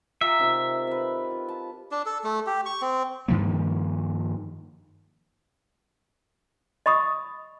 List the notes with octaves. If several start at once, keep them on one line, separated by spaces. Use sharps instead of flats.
F4 G4 E5 A#5
C3 D#3 F4
C4 B4
F4
A5
D4
A4
A3
G4
C#6
C4
G2 D#3 F3 A#3
D#5 B5 C#6 D#6